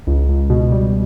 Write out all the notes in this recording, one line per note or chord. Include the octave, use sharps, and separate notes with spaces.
C#2
C#2
B2
G3